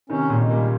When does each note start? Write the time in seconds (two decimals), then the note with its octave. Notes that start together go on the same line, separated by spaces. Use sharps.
0.10 C3 D#3 C#4
0.30 A#2 C#3
0.40 G#3
0.50 G3 A#3